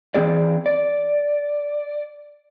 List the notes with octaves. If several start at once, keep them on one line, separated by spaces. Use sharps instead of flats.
E3 C4 G#4 D5
D5